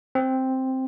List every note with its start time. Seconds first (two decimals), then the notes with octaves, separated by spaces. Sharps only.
0.15 C4